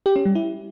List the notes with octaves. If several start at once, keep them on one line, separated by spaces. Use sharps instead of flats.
G4
C#4
G3
E4